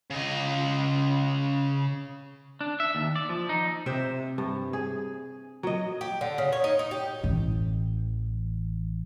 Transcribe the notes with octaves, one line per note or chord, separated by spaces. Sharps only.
C#3 D#5
D4
E5
D#2
D5
F3
D#4
C3 C5 E5
G2
G#4
F#3 D#5
G4
D3
C#3
C#5
D#4
D#4
G4
A1 E3